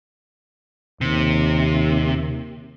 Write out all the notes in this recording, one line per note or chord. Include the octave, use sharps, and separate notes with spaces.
D#2 C3